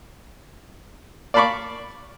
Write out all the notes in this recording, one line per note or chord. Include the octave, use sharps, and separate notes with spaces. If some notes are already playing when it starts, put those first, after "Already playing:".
D5 F5 A5 B5 C#6 D6